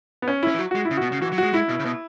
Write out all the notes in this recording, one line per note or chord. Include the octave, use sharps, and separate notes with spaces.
B3
C#4
E4
C#4
E3
F#3
G#3 F#4
E4
C#3
B2 F#4
C#3
E3 F#4
F#3
G#3 F#4
G#3 E4
B2
C#3
B2